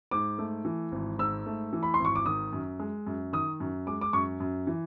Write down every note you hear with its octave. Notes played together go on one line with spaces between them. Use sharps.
G#2 D6
A3
E3
G#1
G#2 E6
A3
E3
B5
C6
G#1
C#6
D6
D#3 D#6
F#2
G#3
F#2
D#3 D#6
F#2
G#3 D6
D6
F#2 C#6
F#2
E3